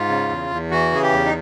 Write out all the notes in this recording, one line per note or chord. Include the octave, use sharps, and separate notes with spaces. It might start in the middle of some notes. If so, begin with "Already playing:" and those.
Already playing: G#2 F4
C#3
E2
E2
E3 F#4
C#3 G#4
G4
E2
D#4